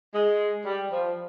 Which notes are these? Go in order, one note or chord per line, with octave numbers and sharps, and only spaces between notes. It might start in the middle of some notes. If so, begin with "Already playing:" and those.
G#3
G3
F3